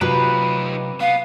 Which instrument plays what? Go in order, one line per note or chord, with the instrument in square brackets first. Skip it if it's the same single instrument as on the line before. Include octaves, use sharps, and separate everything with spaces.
[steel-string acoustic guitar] C3 F#3 F4 [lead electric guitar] D#4 G4 [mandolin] B4
[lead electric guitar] B3 [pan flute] F5